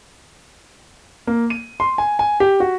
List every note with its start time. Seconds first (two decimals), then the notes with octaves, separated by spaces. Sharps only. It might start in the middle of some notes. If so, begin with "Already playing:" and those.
1.27 A#3
1.50 D#7
1.80 C6
1.98 G#5
2.19 G#5
2.40 G4
2.60 F#4